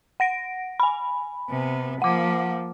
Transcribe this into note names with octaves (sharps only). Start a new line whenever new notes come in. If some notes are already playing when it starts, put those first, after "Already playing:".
F#5 A#6 D7
G#5 B5
C3 B3
F3 A#3 F#5 D6